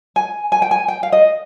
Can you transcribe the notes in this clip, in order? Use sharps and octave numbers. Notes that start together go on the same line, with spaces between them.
G#5
G#5
G5
G#5
G5
F5
D#5